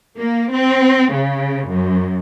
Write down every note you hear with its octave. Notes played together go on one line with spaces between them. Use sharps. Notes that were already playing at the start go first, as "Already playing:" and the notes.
A#3
C4
C#3
F#2